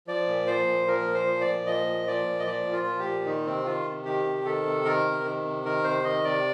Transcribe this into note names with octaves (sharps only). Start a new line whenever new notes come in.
F3 D5
A#2
F3 C5
A#2
F3 A#4
A#2
C5
F3
D5
A#2
F3 D#5
A#2
F3 D5
A#2
D#5
F3 D5
A#2
F4
F3
G4
A#2
D#3 D#4
C3 C4
D#3 F4
C3
D#3 G4
C3
D#3 A4
C3
D#3 A#4
C3
D#3
C3
D#3 A#4
C3 C5
D#3 D#5
C3 D5